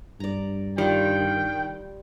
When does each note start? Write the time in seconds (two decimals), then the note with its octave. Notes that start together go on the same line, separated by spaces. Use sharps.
0.20 G2 D5 A#5
0.78 D#3 G3 F4 G5